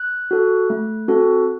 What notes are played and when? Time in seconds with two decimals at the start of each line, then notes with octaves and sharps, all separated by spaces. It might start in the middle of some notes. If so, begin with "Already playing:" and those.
Already playing: F#6
0.31 F#4 A4
0.70 A3
1.08 C4 F#4 A4